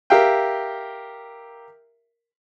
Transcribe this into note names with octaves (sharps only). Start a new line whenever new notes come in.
G4 A#4 E5 F5 G5